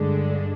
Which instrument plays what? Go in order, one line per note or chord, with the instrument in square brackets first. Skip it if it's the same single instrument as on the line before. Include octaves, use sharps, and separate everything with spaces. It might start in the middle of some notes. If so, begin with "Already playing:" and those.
Already playing: [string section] G2 D3 G#3 D4